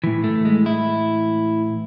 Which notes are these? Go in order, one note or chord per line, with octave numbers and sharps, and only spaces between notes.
A2 E3
A3
G#3
E4